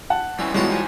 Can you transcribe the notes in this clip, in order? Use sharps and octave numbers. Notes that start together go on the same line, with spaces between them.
F#5 A5
E3 G3 C4 C#4
A2 E3 G3 G#3 B3 C#4 F4 F#4
D#4 C5 G#5